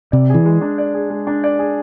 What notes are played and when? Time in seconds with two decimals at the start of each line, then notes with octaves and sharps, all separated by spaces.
0.12 C3 D5
0.30 E3 G#4
0.45 G#3
0.61 D4
0.78 D5
0.94 G#4
1.10 G#3
1.27 D4
1.44 D5
1.59 G#4